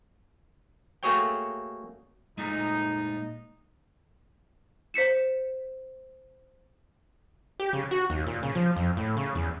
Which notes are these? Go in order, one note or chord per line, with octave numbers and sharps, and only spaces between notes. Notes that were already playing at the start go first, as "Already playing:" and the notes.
A3 A#3 F#4 G#4 C#5 G5
A#2 G#3 A3 D#4
C5 B6 C#7 E7
G4
C#3
F#4
D#2
A#2
C#3
F3
F2
A2
C#3
E2